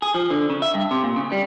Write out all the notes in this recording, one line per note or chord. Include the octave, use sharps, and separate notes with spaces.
G#4
F3
D3
C#3
E5
G2
C3
A#2
C#3
G3